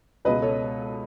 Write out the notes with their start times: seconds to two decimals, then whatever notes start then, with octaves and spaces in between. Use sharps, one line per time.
0.25 C#2 B2 G#3 B4 D#5
0.42 A4 C#5